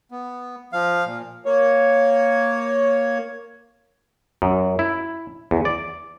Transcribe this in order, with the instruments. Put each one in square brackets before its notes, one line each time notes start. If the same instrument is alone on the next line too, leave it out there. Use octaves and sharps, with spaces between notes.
[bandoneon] B3
F3 F5
A#2
[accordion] A#3 C#5
[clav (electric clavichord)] F#2
E4
E2
D5